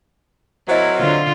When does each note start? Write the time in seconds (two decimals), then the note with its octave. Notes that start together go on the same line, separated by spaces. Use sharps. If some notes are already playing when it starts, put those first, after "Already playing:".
0.68 F#3 C4 E4 A#4 C5 D#5
0.98 D3 F4